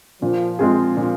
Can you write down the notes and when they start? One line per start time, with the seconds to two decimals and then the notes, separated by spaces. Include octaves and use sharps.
0.22 A#2 F3
0.59 G#3 C4 F4 G#4
0.97 A#2